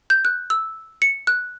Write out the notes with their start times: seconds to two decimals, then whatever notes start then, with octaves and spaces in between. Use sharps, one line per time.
0.10 G6
0.25 F#6
0.50 E6
1.02 C#7
1.27 F#6